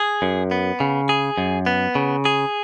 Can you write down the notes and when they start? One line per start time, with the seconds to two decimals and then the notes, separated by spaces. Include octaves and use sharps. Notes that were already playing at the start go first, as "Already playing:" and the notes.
Already playing: G#4
0.22 F#2
0.51 B3
0.80 C#3
1.09 G#4
1.38 F#2
1.66 B3
1.95 C#3
2.25 G#4